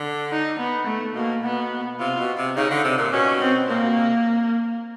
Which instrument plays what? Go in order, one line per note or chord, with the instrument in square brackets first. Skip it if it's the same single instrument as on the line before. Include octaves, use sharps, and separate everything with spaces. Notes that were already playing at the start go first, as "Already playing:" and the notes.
Already playing: [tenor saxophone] D3
[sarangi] D#4
B3
A3
[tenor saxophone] B2 [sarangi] A#3
[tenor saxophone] B2 [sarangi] B3
[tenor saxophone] C3 [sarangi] F4
[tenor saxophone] B2
C3
[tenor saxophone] C#3 [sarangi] D#4
[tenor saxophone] D3
C3
A#2
[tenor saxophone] B2 [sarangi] C#4
[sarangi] C4
[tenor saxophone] A#2 [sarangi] A#3
[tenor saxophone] B2
C3